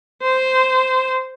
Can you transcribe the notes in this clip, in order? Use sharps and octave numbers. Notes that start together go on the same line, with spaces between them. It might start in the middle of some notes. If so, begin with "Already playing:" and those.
C5